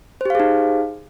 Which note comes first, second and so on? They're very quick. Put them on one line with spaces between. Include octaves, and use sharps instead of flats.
C5 G4 F5 G#4 D#4